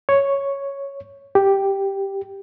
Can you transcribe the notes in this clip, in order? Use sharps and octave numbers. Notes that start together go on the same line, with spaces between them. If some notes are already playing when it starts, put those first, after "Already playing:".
C#5
G4